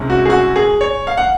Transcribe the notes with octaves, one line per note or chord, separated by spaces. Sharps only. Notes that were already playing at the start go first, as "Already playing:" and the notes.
Already playing: C2 C3 G#3 C#4
F#4
G#4
F#4
G#4
C#5
F5
F#5